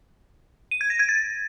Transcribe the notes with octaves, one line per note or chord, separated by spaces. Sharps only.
D#7
G#6
A#6
G#6
A6